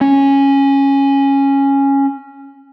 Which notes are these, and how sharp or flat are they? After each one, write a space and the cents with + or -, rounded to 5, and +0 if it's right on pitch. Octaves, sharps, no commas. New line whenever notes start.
C#4 -10